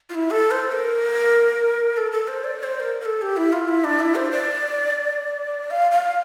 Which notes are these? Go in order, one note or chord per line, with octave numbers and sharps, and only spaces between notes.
F4
E4
A4
C5
A#4
A4
A4
C5
D5
D5
C5
A#4
A#4
A4
G4
E4
F4
E4
D4
E4
C5
D5
F5
F5